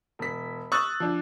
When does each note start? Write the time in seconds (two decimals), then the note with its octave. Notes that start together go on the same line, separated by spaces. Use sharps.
0.19 E1 B6
0.72 C#6 D#6 E6 F#6 A6
1.00 F3 D4